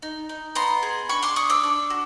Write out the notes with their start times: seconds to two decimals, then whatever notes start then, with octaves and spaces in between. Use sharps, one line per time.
0.02 D#4
0.29 D#4
0.55 B3 A#5 C6
0.83 G#4
1.09 D4 B5 C#6
1.23 C6 D6
1.36 D4 C#6 D#6
1.50 D6 E6
1.63 D4
1.90 F#4